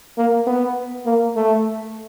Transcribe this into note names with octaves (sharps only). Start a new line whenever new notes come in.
A#3
B3
A#3
A3